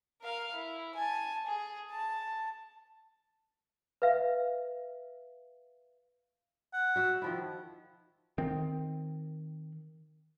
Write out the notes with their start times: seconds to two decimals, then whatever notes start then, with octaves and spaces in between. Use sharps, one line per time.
0.21 A#4 F5
0.54 E4
0.95 G#5 A5
1.46 G#4
1.91 A5
4.02 B4 E5 F5
6.73 F#5
6.96 F#4 E5
7.22 D#3 F3 E4
8.38 D#3 C4